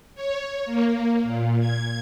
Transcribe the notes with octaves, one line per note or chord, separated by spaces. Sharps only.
C#5
A#3
A#2
G#6